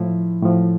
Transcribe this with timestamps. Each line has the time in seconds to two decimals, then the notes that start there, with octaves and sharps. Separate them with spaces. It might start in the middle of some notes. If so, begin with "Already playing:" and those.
Already playing: A2 F3 E4
0.42 A2 F3